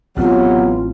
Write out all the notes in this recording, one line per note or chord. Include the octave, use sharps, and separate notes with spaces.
A1 F#3 B3 C4 F4 G4